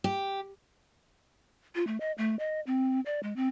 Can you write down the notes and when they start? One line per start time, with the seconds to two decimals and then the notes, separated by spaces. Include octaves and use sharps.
0.04 G4
1.75 F4
1.87 A3
2.00 D#5
2.18 A3
2.39 D#5
2.67 C4
3.06 D5
3.23 G#3
3.36 C4